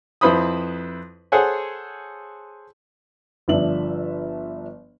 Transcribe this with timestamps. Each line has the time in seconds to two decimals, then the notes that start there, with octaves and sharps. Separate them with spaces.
0.21 F2 E4 B4 C5 B5 D#6
1.32 G#4 A4 C5 C#5 F#5 G#5
3.48 G1 F3 D4 E5 F#7